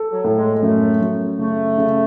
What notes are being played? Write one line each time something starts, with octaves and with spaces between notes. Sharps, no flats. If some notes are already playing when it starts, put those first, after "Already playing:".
Already playing: A4
F#3
A2
G#3
F#2 A3
F#2
C#3 A3
C#3